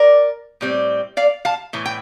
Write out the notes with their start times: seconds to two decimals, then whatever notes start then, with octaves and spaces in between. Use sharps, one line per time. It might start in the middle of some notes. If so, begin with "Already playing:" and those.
Already playing: A#4 D5
0.61 A2 G3 C4
1.17 D5 F5
1.45 F5 A5
1.73 A2 E3
1.85 G5